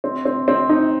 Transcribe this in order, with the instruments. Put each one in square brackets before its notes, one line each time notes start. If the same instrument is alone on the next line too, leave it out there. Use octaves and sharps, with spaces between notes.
[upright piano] C4
C4
C4
D#4